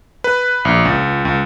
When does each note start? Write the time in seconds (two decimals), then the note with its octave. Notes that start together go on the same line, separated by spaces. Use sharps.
0.24 B4
0.65 A#1
0.85 C#2
1.25 C#2